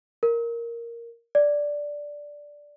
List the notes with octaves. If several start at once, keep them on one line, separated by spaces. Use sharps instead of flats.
A#4
D5